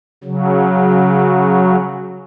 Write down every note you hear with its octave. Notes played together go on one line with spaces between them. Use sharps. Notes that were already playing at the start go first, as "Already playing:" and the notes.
C#3 F#3